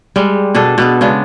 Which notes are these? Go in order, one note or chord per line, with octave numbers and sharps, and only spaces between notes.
G3 G#3
B2 D4 G#4 A4
B2 B3 A4
C#3 G#3 B3 D4